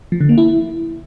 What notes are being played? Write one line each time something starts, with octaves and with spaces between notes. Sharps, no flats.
F3
D3
A#3
E4